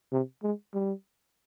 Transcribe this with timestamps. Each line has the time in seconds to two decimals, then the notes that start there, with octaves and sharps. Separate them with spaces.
0.12 C3
0.43 G#3
0.74 G3